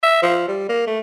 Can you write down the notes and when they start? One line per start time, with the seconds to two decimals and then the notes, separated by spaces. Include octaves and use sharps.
0.03 E5
0.22 F3
0.48 G3
0.69 A#3
0.87 A3